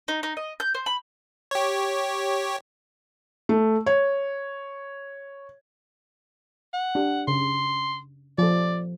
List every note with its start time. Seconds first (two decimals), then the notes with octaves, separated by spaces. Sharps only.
0.08 D#4
0.23 D#4
0.37 D#5
0.60 G6
0.75 C5
0.86 B5
1.51 G4 C#5
3.49 A3
3.86 C#5
6.74 F#5
6.95 D4 G4
7.28 C#3 C6
8.38 F3 A4 D5